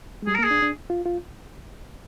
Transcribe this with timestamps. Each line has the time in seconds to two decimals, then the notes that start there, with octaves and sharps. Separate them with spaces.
0.22 G#3
0.27 G3 G#4
0.35 A#4
0.39 A#3
0.43 G#4
0.51 D4
0.62 D4
0.90 F4
1.06 F4